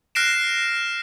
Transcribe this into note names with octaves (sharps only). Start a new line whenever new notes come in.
F6 F#6 A#6 C7 D7 E7